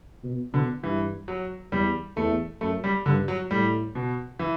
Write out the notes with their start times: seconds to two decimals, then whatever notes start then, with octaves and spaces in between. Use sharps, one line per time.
0.24 B2
0.53 B2 D3
0.83 G2 E3
1.28 F#3
1.72 E2 G3
2.17 E2 A3
2.61 F#2 A3
2.84 G3
3.06 G2 D3
3.28 F#3
3.50 A2 G3
3.95 B2
4.39 E3